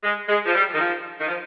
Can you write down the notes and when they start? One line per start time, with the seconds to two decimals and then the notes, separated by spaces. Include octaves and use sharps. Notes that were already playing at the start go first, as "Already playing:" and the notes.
0.03 G#3
0.28 G#3
0.46 F3
0.55 G3
0.74 D#3
0.80 F3
1.19 D#3
1.27 F3